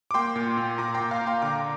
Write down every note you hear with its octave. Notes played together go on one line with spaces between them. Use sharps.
D6
A#3 G5 C6
A#2
A#2
A#2 A#5 D6
G5 C6
A#2
F5 A#5
A#2
G5 C6
D3 A#5 D6